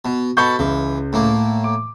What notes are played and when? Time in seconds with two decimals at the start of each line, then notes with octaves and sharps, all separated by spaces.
0.05 B2
0.37 B2 A4 B5 C#6 G6
0.59 C#2 E3
1.13 A2 A#3
1.64 D6